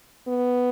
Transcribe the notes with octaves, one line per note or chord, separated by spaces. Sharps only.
B3